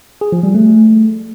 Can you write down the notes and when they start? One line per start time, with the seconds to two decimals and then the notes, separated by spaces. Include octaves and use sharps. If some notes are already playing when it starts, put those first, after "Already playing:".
0.21 G#4
0.32 F3
0.43 G3
0.54 A3